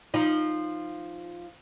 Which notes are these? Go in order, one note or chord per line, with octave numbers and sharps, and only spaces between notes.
F3 D#4